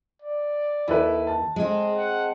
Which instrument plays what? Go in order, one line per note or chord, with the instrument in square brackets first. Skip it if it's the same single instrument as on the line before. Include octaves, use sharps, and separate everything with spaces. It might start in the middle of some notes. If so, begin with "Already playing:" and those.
[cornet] D5
[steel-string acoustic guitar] D#2 [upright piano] E4 A4 B4
[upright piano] A5
[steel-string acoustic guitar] G#3 C4 [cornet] G#4
[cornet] F#5